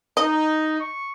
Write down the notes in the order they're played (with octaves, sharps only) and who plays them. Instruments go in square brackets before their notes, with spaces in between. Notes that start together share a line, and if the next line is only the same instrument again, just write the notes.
[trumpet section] D#4 [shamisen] D#5
[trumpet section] C#6